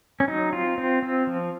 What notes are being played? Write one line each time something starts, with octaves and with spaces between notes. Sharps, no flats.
C#4
F#3 D#4
C4 F4
C4
C4
F3